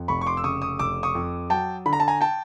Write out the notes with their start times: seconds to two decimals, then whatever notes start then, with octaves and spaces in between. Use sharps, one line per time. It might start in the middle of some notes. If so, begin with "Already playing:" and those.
Already playing: F2
0.08 F1 B5 C#6
0.21 C#6
0.27 C6 D6
0.37 E6
0.44 C#3 C#6 D#6
0.62 C#6 D#6
0.79 F1 D6 E6
1.03 C#6 D#6
1.15 F2
1.50 F#3 G5 A5
1.86 D3 B5
1.93 A#5
2.00 A5
2.08 G#5 A#5
2.21 G5 A5